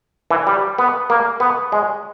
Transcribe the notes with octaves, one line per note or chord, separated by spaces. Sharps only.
E3
G3
B3
A#3
B3
G#3